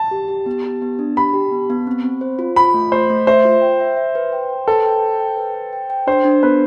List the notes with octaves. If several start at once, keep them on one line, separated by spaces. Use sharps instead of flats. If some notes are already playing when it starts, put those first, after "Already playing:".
Already playing: A5
G4
G4
B3
G4
B3
D4
G4 B5
G4
B3
B3
C4
C4
C5
F4
F4 B5
A3
A3 C5
A3
C5 E5
F4
G5
E5
E5
B4
G5
G5
A4 B4
G5
G5
G5
B4
G5
G5
G5
D4 C5
D4
B3 B4